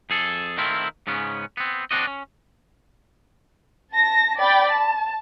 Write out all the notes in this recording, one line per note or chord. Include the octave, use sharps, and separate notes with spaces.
F2 G#4 A4
D#3 A3 C4 E4 F4
G#2 C#3 B3 C#4
B3 C4
C4 D4 F#4 D#5
C#4
A5 A#6
D5 G5 B5 A6
A5